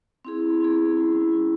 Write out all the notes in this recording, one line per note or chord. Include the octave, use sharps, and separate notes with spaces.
C4 E4 G#4
C4 E4 G#4
G3 C#4 E4 G#4
G3 C#4 E4 G#4